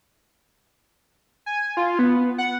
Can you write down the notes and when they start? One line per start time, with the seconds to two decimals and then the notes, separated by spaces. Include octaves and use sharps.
1.46 G#5
1.77 F4
1.99 B3
2.38 F#5